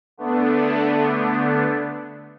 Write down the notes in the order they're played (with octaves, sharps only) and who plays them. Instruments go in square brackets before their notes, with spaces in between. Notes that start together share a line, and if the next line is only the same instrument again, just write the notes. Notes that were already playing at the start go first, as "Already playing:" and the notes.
[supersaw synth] D3 A3 B3 D4